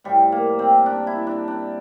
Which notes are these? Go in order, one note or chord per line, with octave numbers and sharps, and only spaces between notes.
A2 F3 G3
A#3
C4
D4
E4
D4
D4